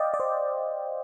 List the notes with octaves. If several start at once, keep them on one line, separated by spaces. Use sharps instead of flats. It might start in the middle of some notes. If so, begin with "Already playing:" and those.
Already playing: D5 D#5 F5 G5
D5
C5